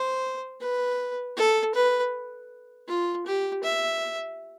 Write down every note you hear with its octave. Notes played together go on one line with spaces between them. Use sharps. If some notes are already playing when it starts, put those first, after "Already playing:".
Already playing: C5
B4
A4
B4
F4
G4
E5